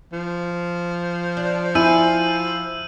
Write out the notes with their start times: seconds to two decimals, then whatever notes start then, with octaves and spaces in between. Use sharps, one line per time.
0.12 F3
1.37 D4
1.75 E4 G#5 E6 G6 D#7